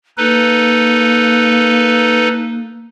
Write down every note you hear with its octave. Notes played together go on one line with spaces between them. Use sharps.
A#3 D#4 A4 B4